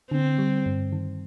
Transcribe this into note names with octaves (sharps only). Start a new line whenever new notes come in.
D3 C4
G3
G2
D#3